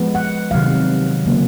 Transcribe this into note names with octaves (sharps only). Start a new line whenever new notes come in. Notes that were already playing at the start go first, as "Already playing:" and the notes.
Already playing: F3 G#3 B3
F#5
C3 D#3 F#3 F5
C#3 F#3 A#3